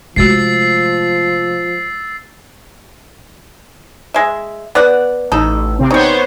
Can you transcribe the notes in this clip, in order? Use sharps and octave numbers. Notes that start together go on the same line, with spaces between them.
C3 F3 G#3 A3 F#4 E6 A6 C7
G#3 E5
B3 D5 F#5
A1 D#4 A4
C3 C4
G3 B3 D#4 C5 C#5